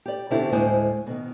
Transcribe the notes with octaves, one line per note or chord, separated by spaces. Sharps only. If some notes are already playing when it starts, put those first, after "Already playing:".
G4 D5
B2 D3 C4 C#4 E4 G4
D2 A2 G#3 E4 C5 G#5
B2 D#3